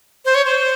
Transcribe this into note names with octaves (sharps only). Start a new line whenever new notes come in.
C5
C#5
C5